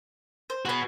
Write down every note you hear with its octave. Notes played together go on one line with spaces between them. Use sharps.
C5
F#4 G#4 B4 C#5